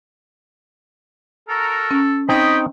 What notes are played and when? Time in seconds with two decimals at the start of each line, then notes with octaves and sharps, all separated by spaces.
1.49 F#4 A4 A#4
1.91 C#4
2.29 C4 D#4 C#5 D#5 G5 B5